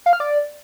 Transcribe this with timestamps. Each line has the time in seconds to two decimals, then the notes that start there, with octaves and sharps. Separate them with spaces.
0.06 F5
0.13 F6
0.20 D5